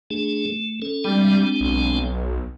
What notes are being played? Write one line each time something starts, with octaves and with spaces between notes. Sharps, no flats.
A3 D4 G#4
A3
C#4 A4
G3 G#3 C4 D4
B1